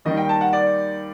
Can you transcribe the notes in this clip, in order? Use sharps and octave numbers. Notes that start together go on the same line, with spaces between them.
D#2 D#3 G3 D#5
G5
A5
F#5
D5